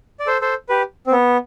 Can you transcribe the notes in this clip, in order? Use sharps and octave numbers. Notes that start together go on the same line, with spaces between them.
D5
A4 C5
A4 C5
G4 B4
C4
B3